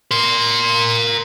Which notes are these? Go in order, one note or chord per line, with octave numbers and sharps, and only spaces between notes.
A#4 C6